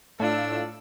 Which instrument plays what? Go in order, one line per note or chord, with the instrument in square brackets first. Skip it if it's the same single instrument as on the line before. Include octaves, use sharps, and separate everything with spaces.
[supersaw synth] A2 E6 [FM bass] A3 [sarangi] D4 [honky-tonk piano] F4 A4